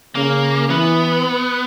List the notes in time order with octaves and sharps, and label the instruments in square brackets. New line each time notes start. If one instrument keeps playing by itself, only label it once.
[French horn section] C#3 [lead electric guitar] A#3
[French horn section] E3 [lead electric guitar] B3